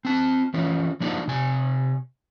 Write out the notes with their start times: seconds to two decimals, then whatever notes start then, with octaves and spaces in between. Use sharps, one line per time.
0.05 C4 A5
0.54 E3 F3 C#4
1.00 F3 A#3 D4 D#4
1.28 C3 G#5